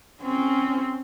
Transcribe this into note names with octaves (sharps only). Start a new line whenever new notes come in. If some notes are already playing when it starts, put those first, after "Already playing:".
C4 C#4